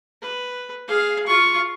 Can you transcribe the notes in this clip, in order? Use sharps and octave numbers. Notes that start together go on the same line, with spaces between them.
B4
G#4 F5
F4 C#6